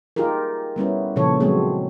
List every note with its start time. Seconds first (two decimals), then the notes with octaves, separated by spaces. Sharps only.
0.16 D#4 F4 G4 G#4 A#4
0.76 G3 B3 C#4 E4
1.16 A#2 C#3 F3 A4 C#5
1.40 F3 F#3 G#3 B3 C4 G#4